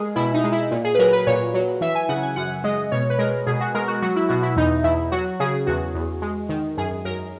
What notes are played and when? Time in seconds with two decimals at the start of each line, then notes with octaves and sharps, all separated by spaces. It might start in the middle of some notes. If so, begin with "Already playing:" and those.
Already playing: G#3 G#4 A#4
0.16 B2 E4
0.34 D#4
0.44 G#3
0.52 E4
0.71 A#2
0.85 G#4
0.95 B4
0.99 F#3 A#4
1.13 B4
1.27 A#2 C#5
1.54 F#3
1.81 E3 E5
1.95 G#5
2.09 C#3 F#5
2.23 G#5
2.36 F#2 F#5
2.64 G#3 D#5
2.92 B2 C#5
3.10 B4
3.19 G#3 A#4
3.47 B2 G#4
3.61 F#4
3.75 G#3 A#4
3.88 F#4
4.02 F#3 F#4
4.16 E4
4.29 B2 F#4
4.43 E4
4.56 E2 D#4
4.84 E2 E4
5.12 F#3 F#4
5.40 C#3 G#4
5.67 E2 F#4
5.94 E2
6.22 G#3
6.49 D#3
6.77 F#2 G#4
7.05 F#2 A#4